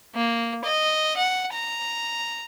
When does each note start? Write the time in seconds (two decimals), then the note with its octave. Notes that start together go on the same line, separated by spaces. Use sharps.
0.15 A#3
0.64 D#5
1.17 F#5
1.53 A#5